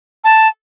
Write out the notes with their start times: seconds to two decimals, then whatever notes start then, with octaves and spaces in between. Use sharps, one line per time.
0.24 A5